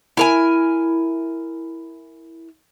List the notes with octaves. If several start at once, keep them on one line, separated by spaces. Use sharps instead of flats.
E4 A#4 G#5